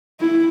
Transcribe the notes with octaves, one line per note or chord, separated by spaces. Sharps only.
E4